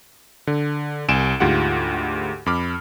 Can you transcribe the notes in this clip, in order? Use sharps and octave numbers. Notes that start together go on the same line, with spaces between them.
D3
C2 G#5 D7 E7
D2 G#2 F4 G4 F#5
F2 B5 D6 F6